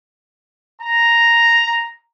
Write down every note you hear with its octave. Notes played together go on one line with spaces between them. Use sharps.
A#5